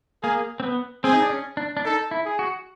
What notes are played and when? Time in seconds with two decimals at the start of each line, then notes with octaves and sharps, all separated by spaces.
0.23 A#3 G#4
0.60 C4
0.63 B3
1.04 C4 G#4
1.13 D#4
1.22 D4
1.30 C#4
1.57 D4
1.77 D4
1.84 D#4 A4
2.11 E4
2.25 G#4
2.39 F#4